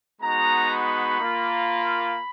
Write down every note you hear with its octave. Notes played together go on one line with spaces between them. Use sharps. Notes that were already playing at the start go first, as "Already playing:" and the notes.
G#3 B3 D#4 F#4 A#5
B5
A#3 F4